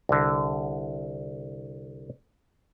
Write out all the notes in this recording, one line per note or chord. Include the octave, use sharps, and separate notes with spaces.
C2 D3